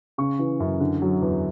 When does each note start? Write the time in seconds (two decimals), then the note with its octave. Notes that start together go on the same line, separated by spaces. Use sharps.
0.18 C#3 C#6
0.39 E3
0.60 F#2
0.80 D3
1.02 F#3
1.22 E2